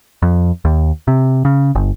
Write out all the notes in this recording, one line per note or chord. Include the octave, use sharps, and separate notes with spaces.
F2
D#2
C3
C#3
G1